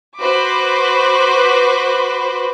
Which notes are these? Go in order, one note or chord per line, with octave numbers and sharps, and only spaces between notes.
F#4 B4 C5 B5 D6